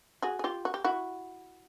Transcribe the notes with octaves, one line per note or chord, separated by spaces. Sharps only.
F#4 G#4
G#4
F4 G4
F#4
G4
E4 F#4